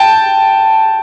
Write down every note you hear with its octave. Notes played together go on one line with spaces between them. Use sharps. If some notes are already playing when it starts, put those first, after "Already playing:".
Already playing: G5 A5